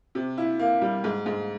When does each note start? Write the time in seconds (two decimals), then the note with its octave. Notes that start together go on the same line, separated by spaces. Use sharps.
0.15 C3
0.38 E4
0.59 A#3
0.81 G3
1.04 G#2
1.26 G#2